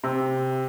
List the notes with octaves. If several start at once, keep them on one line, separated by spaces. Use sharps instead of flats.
C3